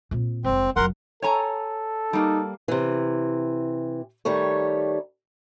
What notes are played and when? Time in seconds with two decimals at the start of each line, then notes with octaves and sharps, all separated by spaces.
0.11 A#2 C4
0.44 F1 G#3 C4
0.76 F1 F#3 A#4 F#5 C6
1.22 A4 C#5 G#5 A#5
2.13 G3 A#3 D#4
2.68 C3 E3
4.25 D#3 G3 A3 C#5